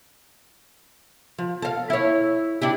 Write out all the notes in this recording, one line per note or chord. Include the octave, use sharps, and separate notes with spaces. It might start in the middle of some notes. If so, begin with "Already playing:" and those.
F3
A4 F5
E4 C#5
D4 E4 G4